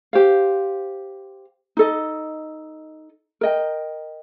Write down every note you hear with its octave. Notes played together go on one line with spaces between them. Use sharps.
G4 C5 F5
D#4 A4 D#5
A#4 D#5 G5